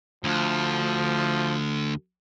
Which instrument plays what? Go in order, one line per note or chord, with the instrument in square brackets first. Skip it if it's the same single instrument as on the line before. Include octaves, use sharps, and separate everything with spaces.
[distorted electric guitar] D2 [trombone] F3